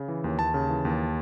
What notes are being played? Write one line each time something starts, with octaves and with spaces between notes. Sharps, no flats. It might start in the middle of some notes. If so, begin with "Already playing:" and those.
Already playing: C#3
E3
D#2
D#2 A5
C#3
E3
D#2